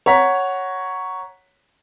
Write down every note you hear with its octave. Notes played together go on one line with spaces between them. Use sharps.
C#5 F#5 A#5 B6